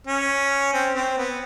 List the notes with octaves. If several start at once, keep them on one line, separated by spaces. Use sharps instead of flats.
C#4
C4
C4
B3